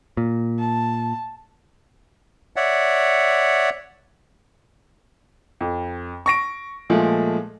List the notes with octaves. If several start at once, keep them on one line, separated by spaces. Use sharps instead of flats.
A#2
A5
C#5 D5 E5 F#5
F2
C#6 A#6 D7
A#2 F3 G#3 A3